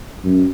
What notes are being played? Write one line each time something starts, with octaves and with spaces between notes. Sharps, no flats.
F#2